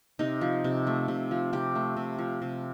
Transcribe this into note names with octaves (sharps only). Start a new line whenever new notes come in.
C3 D#4
F3
C3
A3
C3
F3
C3 G4
A3
C3
F3
C3